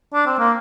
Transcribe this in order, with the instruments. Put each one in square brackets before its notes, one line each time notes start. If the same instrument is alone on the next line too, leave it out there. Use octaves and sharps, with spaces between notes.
[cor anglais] D4
C4
A#3